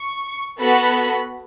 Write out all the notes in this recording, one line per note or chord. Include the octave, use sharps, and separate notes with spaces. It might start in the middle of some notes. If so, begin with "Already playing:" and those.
Already playing: C#6
B3 F#4 A4 B5